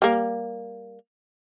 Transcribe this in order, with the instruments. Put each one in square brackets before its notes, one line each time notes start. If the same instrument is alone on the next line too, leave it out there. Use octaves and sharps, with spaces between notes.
[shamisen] G3 A#3